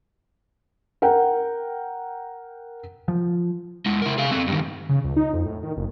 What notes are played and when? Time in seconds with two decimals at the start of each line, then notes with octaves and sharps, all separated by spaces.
1.02 A#4 F#5 G5
3.08 F3
3.86 G#3 E4
4.02 E4 A#4
4.18 G#4 F5
4.32 C4 A4
4.47 G2 D#3
4.89 C#3
5.04 C#2
5.16 D#4
5.33 F2
5.45 A2
5.63 D#3
5.77 F#1